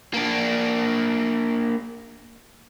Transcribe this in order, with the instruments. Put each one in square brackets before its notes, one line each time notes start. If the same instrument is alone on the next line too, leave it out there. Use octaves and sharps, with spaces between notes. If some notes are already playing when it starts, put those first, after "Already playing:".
[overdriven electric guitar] A#3 D4